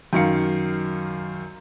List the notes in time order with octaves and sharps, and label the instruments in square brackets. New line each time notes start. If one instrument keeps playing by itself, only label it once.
[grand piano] F#2 D#3 F5 C#7